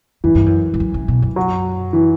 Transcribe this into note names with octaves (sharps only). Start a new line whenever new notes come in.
F#2 E3
G2
F#2
G2
F#2
C#3
B2
F#2
F#3
E3